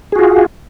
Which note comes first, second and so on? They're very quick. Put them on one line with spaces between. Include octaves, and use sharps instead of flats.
G#4 F#4 F4